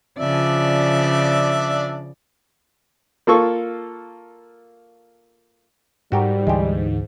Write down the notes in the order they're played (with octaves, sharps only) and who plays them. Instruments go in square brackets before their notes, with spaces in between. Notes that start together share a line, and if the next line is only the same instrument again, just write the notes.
[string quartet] C#3 F3 D5 [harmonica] D4 E5
[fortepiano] A#3 F4 A4 C#6
[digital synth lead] G#2 [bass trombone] G3 [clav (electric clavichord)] F#4 G4 A#4
[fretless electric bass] D2 E3 [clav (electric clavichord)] G#3 G4